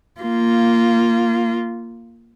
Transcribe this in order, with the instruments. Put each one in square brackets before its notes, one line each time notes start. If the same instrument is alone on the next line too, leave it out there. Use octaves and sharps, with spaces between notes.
[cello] A#3 F4